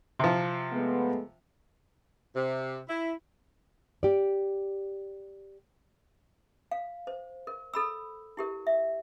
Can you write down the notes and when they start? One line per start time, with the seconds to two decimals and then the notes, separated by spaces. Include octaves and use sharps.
0.19 C3 F3
0.73 G#3 A3 B3
2.36 C3
2.88 E4
4.03 G4 D5
6.71 F5
7.07 C5
7.47 A#4
7.74 A4 B5 E6
8.37 E4 G4 A#4
8.67 E5